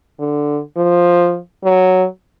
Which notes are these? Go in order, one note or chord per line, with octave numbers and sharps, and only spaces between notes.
D3
F3
F#3